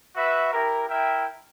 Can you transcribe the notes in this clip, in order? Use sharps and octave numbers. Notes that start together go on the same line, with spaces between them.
F#4 B4 E5
E4 G4 A#4
E4 A#4 E5 G5